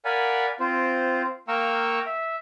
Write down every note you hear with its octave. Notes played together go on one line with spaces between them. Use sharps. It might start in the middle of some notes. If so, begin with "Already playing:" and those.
A#4 D5 F5 F#5 G#5 B5
C4 F4 C5
A#3 F5 G5 A#5 C#6 E6
E5